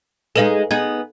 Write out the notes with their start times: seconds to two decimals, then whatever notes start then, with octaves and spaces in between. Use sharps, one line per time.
0.36 G#3 D#4 G#4 A4 B4 F5
0.71 B3 D#4 G#4 G#6